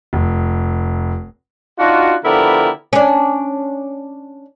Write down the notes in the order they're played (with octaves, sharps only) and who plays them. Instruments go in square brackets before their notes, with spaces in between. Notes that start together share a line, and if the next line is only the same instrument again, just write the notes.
[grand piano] F1
[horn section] D4 D#4 F4 F#4
D3 F3 B3 E4 G4 A#4
[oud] C#4 D4